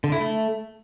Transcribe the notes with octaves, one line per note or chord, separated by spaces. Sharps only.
D3
E4
A3